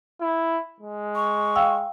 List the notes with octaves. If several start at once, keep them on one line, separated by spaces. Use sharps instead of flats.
E4
G#3
C#6
F5 G5 E6